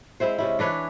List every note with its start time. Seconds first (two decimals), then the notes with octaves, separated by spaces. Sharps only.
0.20 G#3 C4 E4 C5
0.38 C3 C#4 E4
0.59 E3 D4 B4 C#5